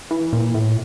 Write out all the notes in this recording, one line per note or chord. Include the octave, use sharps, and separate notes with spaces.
E3
A#2
A2